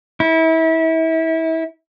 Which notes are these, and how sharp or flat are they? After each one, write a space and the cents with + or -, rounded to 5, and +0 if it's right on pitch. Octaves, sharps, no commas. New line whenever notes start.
E4 -30